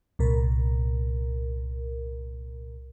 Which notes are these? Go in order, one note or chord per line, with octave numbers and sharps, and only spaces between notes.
C2 A#2 A#4